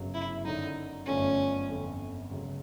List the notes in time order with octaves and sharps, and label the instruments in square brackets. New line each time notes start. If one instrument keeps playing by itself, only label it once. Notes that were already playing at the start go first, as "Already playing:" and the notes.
Already playing: [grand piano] G1 F#2 C#3 F#3
[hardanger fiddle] E4
[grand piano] F#2 D3 F#3 [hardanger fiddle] D#4
[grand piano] G1 F#2 D3 F3 A3 [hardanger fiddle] C#4
[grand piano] G1 F2 D3
C#2 C#3 F#3